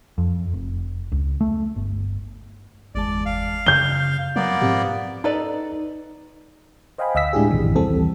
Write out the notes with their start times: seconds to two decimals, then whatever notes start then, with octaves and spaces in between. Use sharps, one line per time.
0.18 F2
0.54 F1
1.12 C#2
1.41 A3
1.76 G1
2.95 G1 E2 G#3 D5 A5
3.26 F5
3.66 F#2 C#3 G6 G7
4.36 F#3 A#3 B3 D5
4.62 G#2 F3 C4 G4
5.24 D#4 A4 B4 D5
6.98 C5 D#5 F5 G5 G#5 B5
7.15 D2 D#5 F5 E6 B6
7.33 A2 G#3 D4 E4 G4 G#4
7.51 A#1 F#2 A2 C3 D#3 E3
7.76 D#2 E3 G3 C4 A4